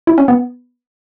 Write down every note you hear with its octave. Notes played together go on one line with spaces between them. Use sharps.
E4
C#4
B3